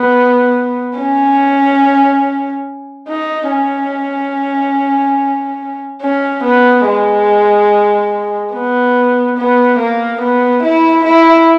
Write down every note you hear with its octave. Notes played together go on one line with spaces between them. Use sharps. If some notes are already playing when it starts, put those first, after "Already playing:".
Already playing: B3
C#4
D#4
C#4
C#4
B3
G#3
B3
B3
A#3
B3
E4
E4